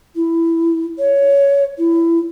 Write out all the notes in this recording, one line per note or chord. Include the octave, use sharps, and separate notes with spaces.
E4
C#5
E4